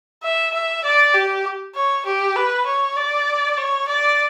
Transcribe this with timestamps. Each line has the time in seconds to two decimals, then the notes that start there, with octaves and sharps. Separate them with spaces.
0.23 E5
0.54 E5
0.84 D5
1.14 G4
1.75 C#5
2.05 G4
2.36 B4
2.66 C#5
2.96 D5
3.57 C#5
3.88 D5